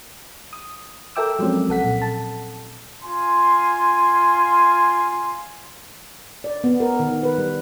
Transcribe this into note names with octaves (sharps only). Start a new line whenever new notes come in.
D#6
A4 A#4 E5 G5 D6 E6
F3 F#3 G#3 C4 C#4
C2 A4 F#5 B6
A#2
A5
F4 G#5 C6
D5
B3
A#4
D#3
B4
G3